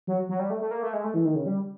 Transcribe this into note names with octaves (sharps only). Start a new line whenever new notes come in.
F#3
F#3
G3
A3
A3
A#3
A3
G#3
A3
E3
D#3
C#3
G3